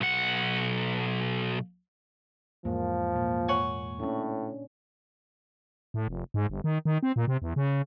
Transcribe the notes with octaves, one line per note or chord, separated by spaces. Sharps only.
B1 F#5
E2 G#2 F3 A#3
A#2
C#5 F#5 G#5
A2 C#4 D4
A2
F1
G#2
G1
D#3
D#3
C4
A#2
C3
E2
C#3